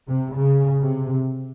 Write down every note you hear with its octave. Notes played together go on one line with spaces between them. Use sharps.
C3
C#3
C3